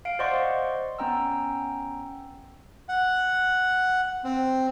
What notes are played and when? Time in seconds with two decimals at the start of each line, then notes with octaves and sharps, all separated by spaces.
0.05 F5 D7
0.19 C5 D5 D#5 F#5 C6 C#6
0.99 B3 C#4 G5 A#5 E6
2.89 F#5
4.24 C4